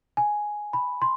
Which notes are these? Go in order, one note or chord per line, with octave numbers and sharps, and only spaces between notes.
G#5
B5
C6